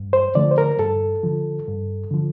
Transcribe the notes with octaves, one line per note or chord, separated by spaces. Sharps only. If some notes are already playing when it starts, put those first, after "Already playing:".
Already playing: G2
C5
D3 F3 A3 D5
C5
A#4
G2 A4
D3 F3
G2
D3 F3